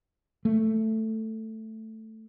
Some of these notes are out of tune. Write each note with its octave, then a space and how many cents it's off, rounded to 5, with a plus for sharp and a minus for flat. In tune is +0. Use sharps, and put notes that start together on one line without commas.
A3 +5